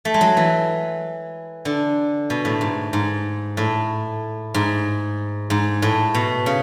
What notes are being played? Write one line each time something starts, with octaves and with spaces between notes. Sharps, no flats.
A3
G#3
F#3
E3
D3
B2
A2
G#2
G#2
A2
G#2
G#2
A2
B2
C#3